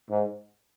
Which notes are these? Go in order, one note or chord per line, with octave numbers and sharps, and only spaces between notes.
G#2